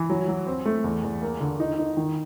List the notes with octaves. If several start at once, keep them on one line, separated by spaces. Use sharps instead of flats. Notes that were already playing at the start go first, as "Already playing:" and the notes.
Already playing: E3
F#3
F#3
C4
A3
E2
E2
A#3
D3
D#4
D#4
D#3